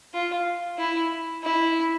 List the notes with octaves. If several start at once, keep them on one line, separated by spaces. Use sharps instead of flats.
F4
E4
E4